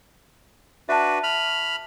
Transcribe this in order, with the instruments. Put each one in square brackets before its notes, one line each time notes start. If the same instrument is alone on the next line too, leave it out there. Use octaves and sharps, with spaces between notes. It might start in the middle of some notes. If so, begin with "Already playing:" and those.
[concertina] D4 F#4 B4 [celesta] E5 A5
[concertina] B5 F6